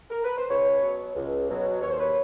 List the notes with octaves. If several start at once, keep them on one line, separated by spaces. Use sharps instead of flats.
A#4
B4
C5
C#2 B4 C#5
B2 F#3
C#2
B2 F#3
D#2 C#5
C5
B4 C#5